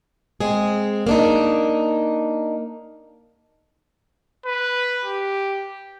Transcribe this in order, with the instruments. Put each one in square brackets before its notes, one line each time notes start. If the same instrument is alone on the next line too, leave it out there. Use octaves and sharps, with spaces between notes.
[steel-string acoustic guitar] G#3 C4 G#4
A#3 D4 D#4
[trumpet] B4
G4